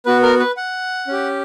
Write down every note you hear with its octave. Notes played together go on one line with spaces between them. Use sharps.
B3 F#4 B4
A#4
B4
F#5
C#4 G4